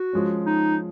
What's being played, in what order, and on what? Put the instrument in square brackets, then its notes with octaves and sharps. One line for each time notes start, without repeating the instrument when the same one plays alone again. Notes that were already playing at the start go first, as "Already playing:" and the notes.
Already playing: [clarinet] F#4
[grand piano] F3 G#3 C#4
[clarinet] D#4